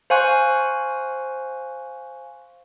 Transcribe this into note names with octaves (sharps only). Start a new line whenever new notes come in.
C5 F5 G#5 C#6 F#6